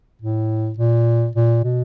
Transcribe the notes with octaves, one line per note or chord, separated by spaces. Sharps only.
A2
A#2
A#2
B2